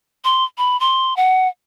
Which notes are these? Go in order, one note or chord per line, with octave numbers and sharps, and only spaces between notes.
C6
B5
C6
F#5